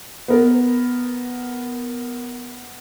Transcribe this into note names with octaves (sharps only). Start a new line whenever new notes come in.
B3 A#4